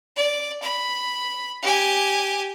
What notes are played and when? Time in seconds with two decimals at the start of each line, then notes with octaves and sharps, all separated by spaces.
0.16 D5
0.62 B5
1.63 G4 G#5